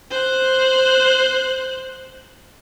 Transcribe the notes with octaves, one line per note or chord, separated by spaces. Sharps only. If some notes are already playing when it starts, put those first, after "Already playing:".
C5 F#6